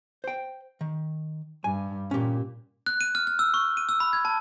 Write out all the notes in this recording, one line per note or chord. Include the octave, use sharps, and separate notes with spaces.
C5 G5
D#3
G2 G#5
A#2 C#4 G4
F#6
D#7
F6
F6
E6
C#6
D#7
E6
B5
G#6
A5